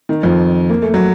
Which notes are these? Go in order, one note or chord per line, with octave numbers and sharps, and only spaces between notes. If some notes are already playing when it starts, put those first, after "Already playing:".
D#3
F2 F3
A#3
A3
F#3